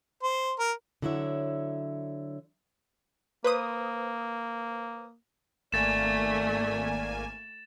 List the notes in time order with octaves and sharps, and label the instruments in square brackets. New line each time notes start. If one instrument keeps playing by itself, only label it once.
[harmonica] C5
A#4
[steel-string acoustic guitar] D3 F#3 E4 C#5 E5
[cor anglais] A#3 [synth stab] B4 C5 D#6
[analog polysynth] G#1 A#3 G#5 [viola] A3 [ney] D5 [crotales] A6 E7